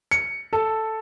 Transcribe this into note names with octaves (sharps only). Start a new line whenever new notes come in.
C#7
A4